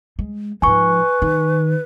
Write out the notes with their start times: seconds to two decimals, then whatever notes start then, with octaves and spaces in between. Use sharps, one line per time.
0.19 G#3
0.62 G#2 F3 B4 G#5 C#6
1.22 D#3